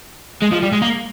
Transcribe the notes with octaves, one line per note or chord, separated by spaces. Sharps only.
G#3
F3
G3
G#3
A#3